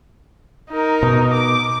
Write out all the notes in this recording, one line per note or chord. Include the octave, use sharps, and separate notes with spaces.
D#4 A#4
B2
D6